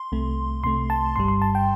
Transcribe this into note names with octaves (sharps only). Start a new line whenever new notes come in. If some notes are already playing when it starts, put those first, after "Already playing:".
Already playing: C6
C2 C3 A3
C2 C3 A3 C6
A5
G1 G2 G3 C6
C6
A5
G5